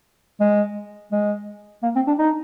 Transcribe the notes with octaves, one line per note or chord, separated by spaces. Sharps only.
G#3
G#3
A#3
C4
D4
D#4